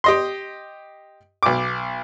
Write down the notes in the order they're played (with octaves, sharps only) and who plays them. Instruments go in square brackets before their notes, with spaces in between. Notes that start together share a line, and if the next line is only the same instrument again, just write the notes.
[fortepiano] G4 D#5 C6
B1 D6